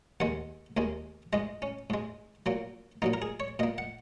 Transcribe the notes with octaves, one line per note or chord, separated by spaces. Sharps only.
D#2 D#3 G#3 F#5
D#2 D#3 G#3
G#2 G#3 D#5
C#4
G#2 G#3
A#2 F#3 A#3
A#2 F#3 A#3 D#4
A#4
G#4
C#5
A#2 A#3 D#5
F#5